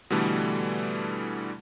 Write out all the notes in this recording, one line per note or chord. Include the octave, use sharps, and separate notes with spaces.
B2 D3 E3 G3 A3